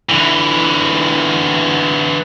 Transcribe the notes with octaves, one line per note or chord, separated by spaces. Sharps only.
D3 E3